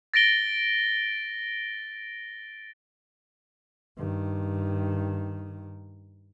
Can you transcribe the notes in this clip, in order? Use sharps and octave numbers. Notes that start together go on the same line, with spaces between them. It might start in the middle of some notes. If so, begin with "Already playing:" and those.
A6 A#6 D7 G7
G2 D#3